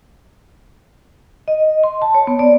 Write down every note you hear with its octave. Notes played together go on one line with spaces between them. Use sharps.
D#5
C6
A5
C#5
B3
D5